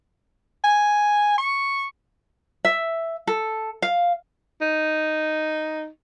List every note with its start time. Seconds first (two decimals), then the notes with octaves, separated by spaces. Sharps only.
0.64 G#5
1.38 C#6
2.65 E5
3.27 A4
3.82 F5
4.61 D#4